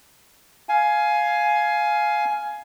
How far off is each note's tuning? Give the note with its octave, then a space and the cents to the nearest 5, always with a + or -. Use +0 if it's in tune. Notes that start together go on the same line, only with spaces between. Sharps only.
F5 +0 G#5 +15